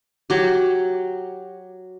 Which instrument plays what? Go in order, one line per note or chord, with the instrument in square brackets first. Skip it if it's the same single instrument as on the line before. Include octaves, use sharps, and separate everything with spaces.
[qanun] F#3 G4